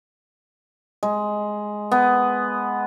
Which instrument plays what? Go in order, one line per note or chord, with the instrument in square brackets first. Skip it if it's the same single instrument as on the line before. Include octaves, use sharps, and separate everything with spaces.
[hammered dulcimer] G#3
B3